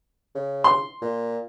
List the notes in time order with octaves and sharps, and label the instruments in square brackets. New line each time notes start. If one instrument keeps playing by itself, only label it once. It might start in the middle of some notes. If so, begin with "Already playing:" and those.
[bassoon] C#3
[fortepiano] C6
[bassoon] A#2